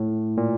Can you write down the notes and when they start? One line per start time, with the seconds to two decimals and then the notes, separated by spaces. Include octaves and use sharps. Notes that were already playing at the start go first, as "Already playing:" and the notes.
Already playing: A2
0.37 A#2